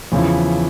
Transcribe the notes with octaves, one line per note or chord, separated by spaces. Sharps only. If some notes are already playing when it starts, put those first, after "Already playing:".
E2 C#3 F3 C#4 E4